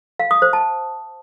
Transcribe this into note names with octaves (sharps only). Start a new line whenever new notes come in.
F5
D#6
C5
A5